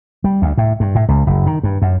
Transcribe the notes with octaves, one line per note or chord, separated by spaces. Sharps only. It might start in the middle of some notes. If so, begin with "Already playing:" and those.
G3
D2
A2
G2
A2
C#2
F#1
D#3
G2
F#2